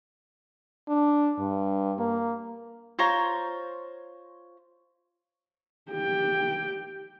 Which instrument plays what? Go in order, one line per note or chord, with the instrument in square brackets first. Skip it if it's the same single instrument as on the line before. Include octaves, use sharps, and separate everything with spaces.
[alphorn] D4
G2
A#3
[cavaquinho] F4 C5 C#5 A#5
[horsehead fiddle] G4 G5